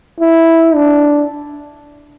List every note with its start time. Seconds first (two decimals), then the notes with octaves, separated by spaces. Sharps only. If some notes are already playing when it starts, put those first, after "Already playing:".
0.20 E4
0.75 D4